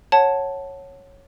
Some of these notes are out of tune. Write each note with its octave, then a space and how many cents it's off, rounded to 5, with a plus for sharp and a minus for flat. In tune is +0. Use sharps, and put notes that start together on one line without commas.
C#5 -10 F#5 +0 A5 +0